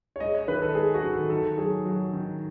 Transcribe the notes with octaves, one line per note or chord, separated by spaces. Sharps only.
C#5
G#3 D#5
C#5
D#3 B4
A4
G#3 G#4
F#4
D#3
A4
D#3 A4
F#3 G#4
F#3
D#3